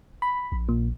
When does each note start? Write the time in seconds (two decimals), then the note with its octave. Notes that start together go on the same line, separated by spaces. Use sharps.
0.22 B5
0.52 A#1
0.69 A#2